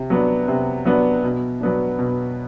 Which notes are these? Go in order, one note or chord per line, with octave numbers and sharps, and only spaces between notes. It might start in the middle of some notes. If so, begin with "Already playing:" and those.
Already playing: C3
F#3 B3 D4
C3
F#3 B3 D4
B2
F#3 B3 D4
B2